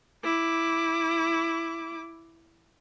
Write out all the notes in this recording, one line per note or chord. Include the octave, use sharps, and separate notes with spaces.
E4 D6